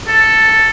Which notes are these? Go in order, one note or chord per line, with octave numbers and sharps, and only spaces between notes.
A4